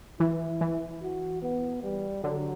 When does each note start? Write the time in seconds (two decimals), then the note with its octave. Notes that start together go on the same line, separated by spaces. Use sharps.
0.20 E3 E4
0.61 E3
1.02 F#4
1.42 B3
1.83 G3
2.24 D3 F#3